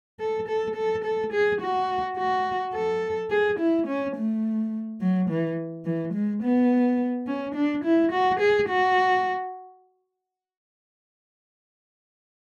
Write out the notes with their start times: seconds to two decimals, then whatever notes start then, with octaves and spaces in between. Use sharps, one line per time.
0.20 A4
0.48 A4
0.76 A4
1.04 A4
1.33 G#4
1.62 F#4
2.17 F#4
2.75 A4
3.30 G#4
3.60 E4
3.87 C#4
4.17 A3
5.01 F#3
5.30 E3
5.85 E3
6.14 G#3
6.43 B3
7.27 C#4
7.55 D4
7.85 E4
8.12 F#4
8.40 G#4
8.69 F#4